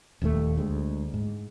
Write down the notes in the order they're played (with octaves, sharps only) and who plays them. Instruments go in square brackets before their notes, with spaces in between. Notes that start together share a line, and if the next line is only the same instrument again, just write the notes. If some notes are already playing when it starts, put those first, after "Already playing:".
[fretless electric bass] D#1 D#2 D#3 A3
D2 G#3
G#2